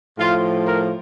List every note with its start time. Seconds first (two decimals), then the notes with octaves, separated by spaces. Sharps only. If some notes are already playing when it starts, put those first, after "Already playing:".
0.18 A2 F3 F4
0.65 A#4